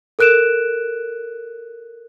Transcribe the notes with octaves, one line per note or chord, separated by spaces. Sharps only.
A4 A#4 F#6 D7 E7